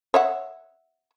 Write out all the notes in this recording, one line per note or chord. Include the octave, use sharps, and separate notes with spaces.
C#5 E5 F#5